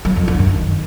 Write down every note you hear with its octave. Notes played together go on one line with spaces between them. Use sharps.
F#3
F2
D3
F#2
D#3